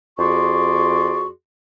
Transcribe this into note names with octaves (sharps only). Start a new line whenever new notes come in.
F2 F#4 G#4 D5 C6 C#6